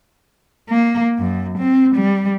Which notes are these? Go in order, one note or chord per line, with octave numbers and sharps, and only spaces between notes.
A#3
F#2
C4
G3